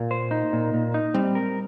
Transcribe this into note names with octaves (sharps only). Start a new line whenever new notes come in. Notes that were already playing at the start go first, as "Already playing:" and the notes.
Already playing: A#2 A#3
C5
D#4
A#2
A#2
D#4
G3 C4
A#4